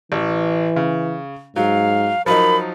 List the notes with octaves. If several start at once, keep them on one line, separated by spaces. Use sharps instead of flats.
A1 E3
C#3
G#2 F#3 F5
F3 F#3 D#4 A#4 B5